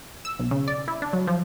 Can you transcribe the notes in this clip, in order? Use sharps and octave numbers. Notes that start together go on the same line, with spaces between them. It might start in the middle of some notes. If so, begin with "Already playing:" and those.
E6
B1
C#3
D5
E4
D4
F#3
F3